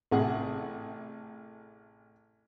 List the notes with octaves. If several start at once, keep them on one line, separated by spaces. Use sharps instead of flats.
A1 C3 G#4 F#5